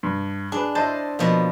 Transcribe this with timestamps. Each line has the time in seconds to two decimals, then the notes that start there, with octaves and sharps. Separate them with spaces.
0.03 G2
0.52 D4 G#4 B4
0.75 E4 C5 D#5 A5
1.19 B2 F3 A#3